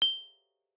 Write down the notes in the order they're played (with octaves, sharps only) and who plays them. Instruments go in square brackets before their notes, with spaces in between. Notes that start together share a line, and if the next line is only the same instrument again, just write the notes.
[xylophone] G7